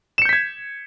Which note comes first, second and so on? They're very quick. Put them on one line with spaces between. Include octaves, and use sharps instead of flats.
E7 C#7 G6 B6 G#6